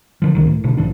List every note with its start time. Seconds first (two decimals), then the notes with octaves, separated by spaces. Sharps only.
0.22 D3 F3
0.35 C2 D#3
0.47 A2
0.64 G#1 B2 D3
0.77 A#1 G#2 E3 D4